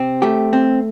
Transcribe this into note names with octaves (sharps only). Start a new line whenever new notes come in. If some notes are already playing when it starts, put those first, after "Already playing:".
Already playing: C3 C4
A3 G4
C4